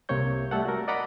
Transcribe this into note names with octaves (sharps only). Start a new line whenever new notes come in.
C2 C3 A#3 C4 C#5 G6
G3 A3 A4 F#5
F#4 A#4
D5 D#5 F#5 A#5 B5 D6